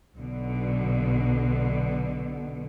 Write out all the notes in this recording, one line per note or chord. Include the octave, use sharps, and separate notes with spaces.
B1 B2 D3